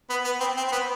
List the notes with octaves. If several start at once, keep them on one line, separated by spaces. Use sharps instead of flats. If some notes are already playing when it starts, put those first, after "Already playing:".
B3
B3
C4
C4
C4
B3